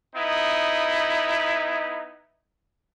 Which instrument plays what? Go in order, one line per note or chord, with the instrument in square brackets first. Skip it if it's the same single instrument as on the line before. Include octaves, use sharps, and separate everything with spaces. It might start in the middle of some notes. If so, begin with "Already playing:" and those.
[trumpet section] B3 D#4 E4